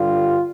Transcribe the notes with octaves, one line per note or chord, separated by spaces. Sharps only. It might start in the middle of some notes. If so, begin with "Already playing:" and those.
Already playing: G2 D3 G3 F4